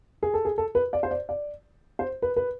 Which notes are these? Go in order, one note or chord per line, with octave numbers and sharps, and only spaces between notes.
G#4
A4
G#4
A4
B4
D5
C5
D5
D5
C5
B4
B4